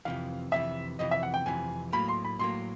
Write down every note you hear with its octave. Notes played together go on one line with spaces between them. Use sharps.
F2 C3 E3 F5
F2 C3 E3 E5
F2 C3 E3 D#5
E5
F#5
G5
F2 C3 E3 G#5
A2 F#3 A#3 B5
C6
B5
A2 F#3 A#3 C6